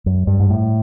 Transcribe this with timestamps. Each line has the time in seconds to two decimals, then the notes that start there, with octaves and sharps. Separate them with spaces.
0.06 F#2
0.27 G2
0.40 G#2
0.50 A2